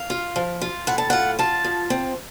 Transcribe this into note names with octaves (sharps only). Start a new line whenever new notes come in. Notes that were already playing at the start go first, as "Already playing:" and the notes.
Already playing: F5
F4
F3
F4
A2 F#5
A5
F4 F#5
F4 A5
F3
C4